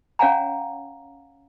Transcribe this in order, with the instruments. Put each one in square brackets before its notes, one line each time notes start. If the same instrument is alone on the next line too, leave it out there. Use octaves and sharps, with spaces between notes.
[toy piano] C#4 C#5 F5 F#5 G#5 A#5